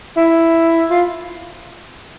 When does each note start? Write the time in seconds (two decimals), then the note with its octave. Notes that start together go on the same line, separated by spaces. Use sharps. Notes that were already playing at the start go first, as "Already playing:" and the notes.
0.17 E4
0.91 F4